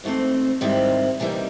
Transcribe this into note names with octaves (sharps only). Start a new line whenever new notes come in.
G#2 E3 A3 C4
G#2 D#3 G3 C4 E4
C3 E3 G3 A#3 D#4